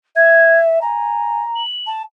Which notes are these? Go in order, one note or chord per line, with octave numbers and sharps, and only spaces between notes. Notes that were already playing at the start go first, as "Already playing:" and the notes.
E5 G#6
G#5 A#5
F#7
A5